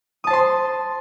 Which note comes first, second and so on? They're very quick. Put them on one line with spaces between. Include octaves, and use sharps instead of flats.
D#6 A5 C5 C6